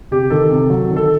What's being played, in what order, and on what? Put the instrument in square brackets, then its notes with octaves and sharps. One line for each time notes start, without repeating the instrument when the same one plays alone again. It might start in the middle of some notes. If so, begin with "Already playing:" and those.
[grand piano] C3 G4
D#3 A4
C3
F#3
D#3
A4